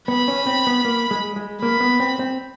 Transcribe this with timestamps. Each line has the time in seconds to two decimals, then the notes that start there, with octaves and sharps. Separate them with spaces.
0.08 B3 B5
0.28 C#4
0.46 C4
0.67 B3
0.85 A#3
1.11 G#3
1.36 G#3
1.62 A#3 B5
1.80 B3
2.00 C4
2.19 C4